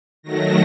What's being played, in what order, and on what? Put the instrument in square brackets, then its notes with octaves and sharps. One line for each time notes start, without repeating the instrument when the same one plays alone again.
[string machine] D#3 F#3 A3 A#6